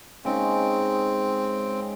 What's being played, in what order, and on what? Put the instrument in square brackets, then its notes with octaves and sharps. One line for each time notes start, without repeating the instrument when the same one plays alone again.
[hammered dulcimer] C#3 G#3 D#4 [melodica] C4